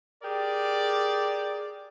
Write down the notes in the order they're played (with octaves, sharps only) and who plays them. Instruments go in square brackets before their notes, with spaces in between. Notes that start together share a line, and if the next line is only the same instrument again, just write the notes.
[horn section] G4 G#4 A#4 D5